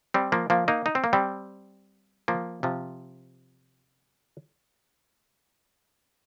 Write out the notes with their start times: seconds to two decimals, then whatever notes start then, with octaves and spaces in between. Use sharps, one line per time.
0.14 G3 C4
0.32 F3 A#3
0.50 F3 A#3
0.68 A#3 D#4
0.86 D#4
0.95 C4
1.04 A#3
1.13 G3 C4
2.28 F3 A#3
2.63 C3 F3